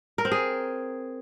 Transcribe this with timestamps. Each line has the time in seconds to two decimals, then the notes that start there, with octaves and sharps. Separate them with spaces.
0.18 A#4
0.25 C4
0.32 G#4